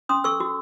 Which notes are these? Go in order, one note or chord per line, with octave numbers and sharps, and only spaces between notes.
C#4 C6 D#6
A4 C#6 E6
F#4